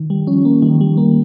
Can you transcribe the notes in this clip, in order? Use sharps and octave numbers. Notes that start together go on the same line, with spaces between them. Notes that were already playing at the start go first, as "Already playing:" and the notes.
Already playing: D#3
G3
F3 C#4
A#3
D#3 G3
G3
A#3